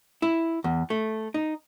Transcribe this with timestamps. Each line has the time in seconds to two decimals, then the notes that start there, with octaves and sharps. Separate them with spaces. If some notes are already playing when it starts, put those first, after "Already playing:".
0.22 E4
0.64 E2
0.90 A3
1.34 D#4